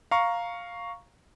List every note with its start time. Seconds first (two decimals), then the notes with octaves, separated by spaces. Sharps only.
0.11 F5 A#5 C#6